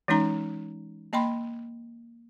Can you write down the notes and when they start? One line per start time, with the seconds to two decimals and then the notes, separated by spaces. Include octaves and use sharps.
0.08 E3 G#3 C#4 D#4 A#5
1.13 A#3 D#5 G5 B5 C6